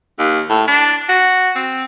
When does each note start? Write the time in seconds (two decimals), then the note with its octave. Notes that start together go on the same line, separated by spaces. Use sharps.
0.19 D#2
0.50 A2
0.68 D4
1.09 F#4
1.55 C4